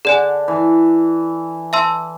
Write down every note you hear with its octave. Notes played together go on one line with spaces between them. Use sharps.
D3 G#4 D5 G#5
E3
E5 A5 C6 E6